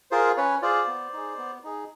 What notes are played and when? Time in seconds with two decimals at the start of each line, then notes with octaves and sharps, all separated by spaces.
0.11 F4 G#4 A#4 C5
0.37 C#4 B4 C#5
0.62 F4 G#4 C5 D5
0.87 B3
1.13 D#4 G#4
1.38 B3
1.64 D#4 G#4